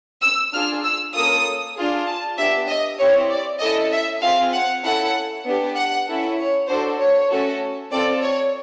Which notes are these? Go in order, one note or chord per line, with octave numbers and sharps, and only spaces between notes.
E6
D4 F4 G#4 F6
E6
A#3 C#4 F4 A4 D#6
D4 F4 G#4
A5
B3 D4 G4 E5
D#5
C4 E4 G4 C#5
D5
C#4 E4 A4 D#5
E5
C4 F4 G#4 F5
F#5
C#4 E4 A4 F#5
B3 D4 G4
F#5
C#4 E4 A4
C#5
D4 F#4 A4 C5
C#5
A3 C#4 F#4 A4
C4 F4 A4 D5
C#5